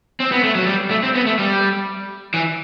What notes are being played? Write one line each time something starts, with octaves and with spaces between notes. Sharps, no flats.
C4
B3
A3
F#3
G3
A3
C4
B3
A3
G3
E3